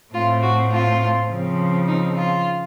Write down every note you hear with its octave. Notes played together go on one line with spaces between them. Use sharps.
A2 A3 C4 F4
F#4
F4
C#3 F3 C4
D#4
F4